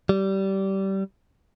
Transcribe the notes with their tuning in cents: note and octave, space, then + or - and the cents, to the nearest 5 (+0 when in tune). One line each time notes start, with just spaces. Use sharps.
G3 -20